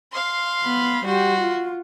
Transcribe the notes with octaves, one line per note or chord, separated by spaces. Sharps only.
F5 C6
B3 B5
G3 F#4 G4 C6
F4